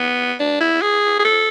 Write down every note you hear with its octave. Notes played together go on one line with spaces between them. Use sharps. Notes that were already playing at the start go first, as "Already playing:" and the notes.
Already playing: B3
D4
E4
G#4
G#4
A4